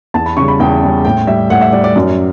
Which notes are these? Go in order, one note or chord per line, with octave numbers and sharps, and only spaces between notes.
E2 A5
B5
C#3 C#6
G3
B5
E2 G5
C#3 G3
A2 G5
G3 E5
A2 F#5
E5
G3 D5
D5
F#2